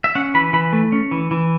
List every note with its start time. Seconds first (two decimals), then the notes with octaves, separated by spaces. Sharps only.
0.04 E5
0.15 C#4 F#5
0.34 E3 B5
0.53 E3 B5
0.73 A3
0.92 C#4
1.11 E3
1.31 E3